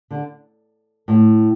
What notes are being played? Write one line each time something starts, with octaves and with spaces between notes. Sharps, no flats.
D3
A2